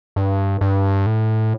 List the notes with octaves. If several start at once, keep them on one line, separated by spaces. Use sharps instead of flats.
G2
G2
A2